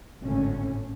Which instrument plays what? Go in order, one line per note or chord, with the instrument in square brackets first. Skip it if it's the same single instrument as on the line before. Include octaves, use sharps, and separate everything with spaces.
[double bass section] G#1 A2 D3 C#4